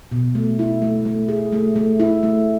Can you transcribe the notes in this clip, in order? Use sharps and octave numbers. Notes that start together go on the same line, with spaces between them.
B2
A3
E4
A3
A3
G#4
A3
A3
E4
A3